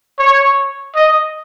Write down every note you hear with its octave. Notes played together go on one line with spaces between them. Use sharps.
C#5
D#5